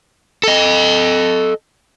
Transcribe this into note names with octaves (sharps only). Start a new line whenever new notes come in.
A4 D#5